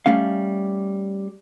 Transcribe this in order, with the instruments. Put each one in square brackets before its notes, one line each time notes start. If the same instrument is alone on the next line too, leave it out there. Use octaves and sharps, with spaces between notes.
[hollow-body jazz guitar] G3 A3 C#4 F5